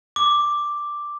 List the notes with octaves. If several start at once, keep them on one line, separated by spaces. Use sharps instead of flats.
D6